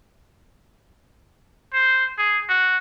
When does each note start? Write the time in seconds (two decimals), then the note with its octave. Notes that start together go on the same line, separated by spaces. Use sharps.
1.73 C5
2.18 G#4
2.49 F#4